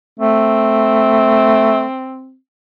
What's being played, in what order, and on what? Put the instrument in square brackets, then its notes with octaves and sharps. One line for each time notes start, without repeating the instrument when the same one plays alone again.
[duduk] A3 [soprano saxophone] C4